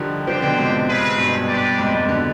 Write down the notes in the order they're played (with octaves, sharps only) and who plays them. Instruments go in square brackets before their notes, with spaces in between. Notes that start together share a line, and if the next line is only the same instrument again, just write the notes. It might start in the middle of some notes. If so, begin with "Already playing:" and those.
Already playing: [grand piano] D3 D#3 F3 G3
[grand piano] D3 F3 [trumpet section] D4 G4 C5 G5
[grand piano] B2 D3
G#2 C3
[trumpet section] C4 F4 G#4 B4
[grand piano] G2 B2
[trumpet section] D4 G4 B4 D5
[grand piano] F2 G#2
F2 G#2
B2 D3